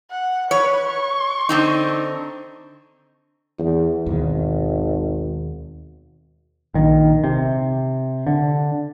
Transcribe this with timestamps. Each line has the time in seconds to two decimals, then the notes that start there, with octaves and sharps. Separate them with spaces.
0.11 F#5
0.51 B4 C#5
0.87 C#6
1.49 D3 C4 D#4
3.59 E2
4.06 G#1 D#2 B2 D#3
6.74 A#1 D#3
7.24 C3
8.27 D3